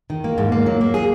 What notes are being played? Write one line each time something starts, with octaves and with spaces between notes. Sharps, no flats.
D#3
A#3
G#2
A#3
F#3
A#3
G#4